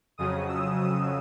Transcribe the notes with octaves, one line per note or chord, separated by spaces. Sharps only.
F2 C#3 F#3 D#6
E6
D#6